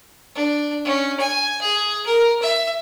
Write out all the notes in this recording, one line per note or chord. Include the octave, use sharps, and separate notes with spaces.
D4
C#4
G#5
G#4
A#4
E5